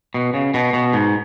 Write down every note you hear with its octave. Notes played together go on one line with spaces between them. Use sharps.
B2
C#3
B2
B2
G#2